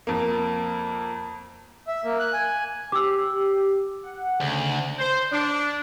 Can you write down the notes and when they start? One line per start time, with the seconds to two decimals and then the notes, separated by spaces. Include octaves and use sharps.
0.07 F2 A#3
1.87 E5
2.04 A#3
2.19 F#6
2.33 G#5
2.92 G4 D6 E6
4.03 F#5
4.40 D2 C#3
4.99 C5
5.32 D4